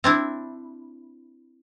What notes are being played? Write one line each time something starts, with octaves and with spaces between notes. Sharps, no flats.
C4 D4 E4